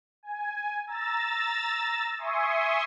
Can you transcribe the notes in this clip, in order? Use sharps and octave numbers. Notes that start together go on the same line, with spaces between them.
G#5
A#5 E6 A6
E5 G#5 C6 C#6 D#6